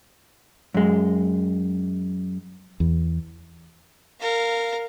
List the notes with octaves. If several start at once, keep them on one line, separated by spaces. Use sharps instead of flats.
F#2 G#3
E2
A#4 F5